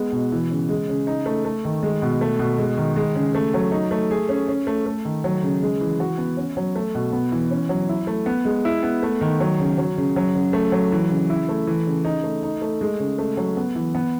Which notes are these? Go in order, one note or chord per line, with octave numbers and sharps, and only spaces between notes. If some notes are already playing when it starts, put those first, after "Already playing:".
Already playing: G#3 B3
B2
E3
C#3
G#3
C#3
D#4
A3
A3
D#3
G#3
B2
A3
B2
G#3
D#3
G#3
C#3
A3
F#3
D#4
A3
G#4
C#4
C#4
A3
A3
D#3
F#3
C#3
G#3
E3
F#4
B3
C#4
F#3
A3
B2
B3
E3
C#4
F#3
E4
A3
B3
G#3
E4
B3
A3
D#3
F#3
C#3
F#3
C#3
F#3
C#3
A3
F#3
E3
C#3
E4
A3
E3
C#3
D#4
A3
D#4
A3
G#3
C#3
A3
F#3
B3
E3
B3